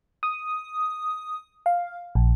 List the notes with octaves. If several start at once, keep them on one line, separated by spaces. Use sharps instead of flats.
D#6
F5
A#1